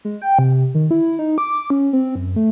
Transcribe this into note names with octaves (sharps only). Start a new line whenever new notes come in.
G#3
G5
C3
D#3
E4
D#4
D6
C#4
C4
F#2
A3